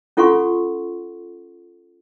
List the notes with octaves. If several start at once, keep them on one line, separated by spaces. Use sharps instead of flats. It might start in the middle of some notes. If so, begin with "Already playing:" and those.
C#4 F4 A4 F#5 C6 C#6